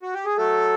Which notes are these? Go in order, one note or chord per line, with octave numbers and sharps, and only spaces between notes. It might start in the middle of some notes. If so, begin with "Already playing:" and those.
F#4
G4
G#4
F#3 A3 A4